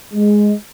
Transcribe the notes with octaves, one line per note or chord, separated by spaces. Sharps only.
G#3